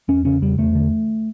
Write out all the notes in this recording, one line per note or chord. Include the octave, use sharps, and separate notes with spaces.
E2 C#4
C#3 C#4
E2 G3
E2 A3
D3